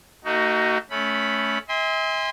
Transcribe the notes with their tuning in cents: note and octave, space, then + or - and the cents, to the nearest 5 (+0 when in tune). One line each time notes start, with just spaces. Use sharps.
A3 +45 D#4 +0 F#4 +20
A3 -15 C#4 +5 B5 +0
E5 -45 G#5 -40 C6 -10